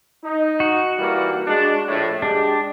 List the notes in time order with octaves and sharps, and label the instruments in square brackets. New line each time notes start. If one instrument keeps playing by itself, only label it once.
[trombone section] D#4
[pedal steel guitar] F#4
[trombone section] E3 G3 A#3
G#3 D4
A#1 A2
[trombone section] G#3 G4 [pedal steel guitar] D4